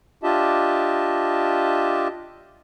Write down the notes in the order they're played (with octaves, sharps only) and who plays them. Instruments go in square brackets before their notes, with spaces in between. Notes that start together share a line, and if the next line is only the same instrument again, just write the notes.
[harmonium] D4 F4 G4 D#5 E5 A5